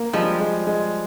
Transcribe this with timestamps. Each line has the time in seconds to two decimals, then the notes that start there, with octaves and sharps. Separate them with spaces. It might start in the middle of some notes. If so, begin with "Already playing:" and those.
Already playing: A#3
0.13 F3 G3 G#3
0.40 G#3
0.67 G#3